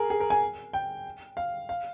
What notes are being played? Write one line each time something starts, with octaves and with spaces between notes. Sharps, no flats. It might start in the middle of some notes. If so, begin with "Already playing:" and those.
Already playing: G#4 A#4
G#4
A#4
G#5
G5
F5
F5